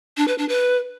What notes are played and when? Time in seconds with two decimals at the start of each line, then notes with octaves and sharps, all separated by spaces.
0.17 D4
0.28 B4
0.38 D4
0.49 B4